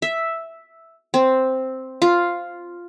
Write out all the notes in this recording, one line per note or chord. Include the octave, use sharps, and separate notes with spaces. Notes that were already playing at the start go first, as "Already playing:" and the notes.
E5
C4
F4